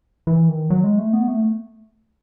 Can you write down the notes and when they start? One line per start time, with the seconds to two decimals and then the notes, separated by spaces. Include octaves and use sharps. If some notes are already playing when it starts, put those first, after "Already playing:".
0.27 E3
0.49 D#3
0.70 F#3
0.84 G#3
0.98 A3
1.13 B3
1.28 A3